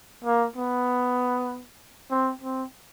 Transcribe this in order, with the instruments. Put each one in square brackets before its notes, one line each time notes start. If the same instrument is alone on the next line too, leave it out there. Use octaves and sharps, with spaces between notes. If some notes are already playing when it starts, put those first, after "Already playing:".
[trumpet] A#3
B3
C4
C4